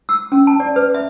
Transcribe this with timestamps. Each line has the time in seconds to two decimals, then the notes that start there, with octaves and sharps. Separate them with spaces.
0.09 E6
0.32 C#4
0.47 A5
0.60 D5
0.76 B4
0.94 E5